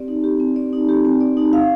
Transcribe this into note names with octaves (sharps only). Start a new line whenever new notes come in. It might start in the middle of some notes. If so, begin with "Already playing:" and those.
Already playing: C4 G4 D5
D#4
G4
C4
D5
D#4
G4
C4
D5
D#4
F5